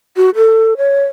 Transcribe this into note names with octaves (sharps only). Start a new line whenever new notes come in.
F#4
A4
C#5